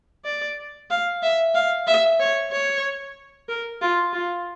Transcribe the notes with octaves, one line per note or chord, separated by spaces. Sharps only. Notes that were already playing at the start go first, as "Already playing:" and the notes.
D5
F5
E5
F5
E5
C#5
C#5
A#4
F4
F4